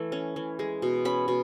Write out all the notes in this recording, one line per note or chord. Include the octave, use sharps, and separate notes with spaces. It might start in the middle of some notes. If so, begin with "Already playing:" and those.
Already playing: E3 A3
C#4
E3
G#3
B2
C#4 B5
B2